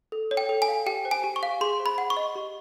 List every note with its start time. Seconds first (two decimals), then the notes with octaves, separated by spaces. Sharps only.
0.12 A4
0.31 C#5
0.37 G5
0.49 A4
0.62 G#5
0.68 F5
0.86 G4 G5
1.05 C5
1.11 G#5
1.24 G4
1.36 C#6
1.43 F5
1.61 G#4 C6
1.80 C5
1.86 B5
1.98 F#5
2.10 C#6
2.17 D#5
2.35 G4